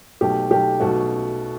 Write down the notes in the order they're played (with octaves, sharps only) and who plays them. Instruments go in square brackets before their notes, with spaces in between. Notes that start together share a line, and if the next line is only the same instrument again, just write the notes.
[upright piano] B1 B2 A3 [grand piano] G4
[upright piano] B1 B2 A3 [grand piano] G4
[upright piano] B1 B2 A3 [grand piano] F#4